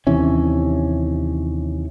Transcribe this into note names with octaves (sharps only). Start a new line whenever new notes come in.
D#2 C3 E3 C#4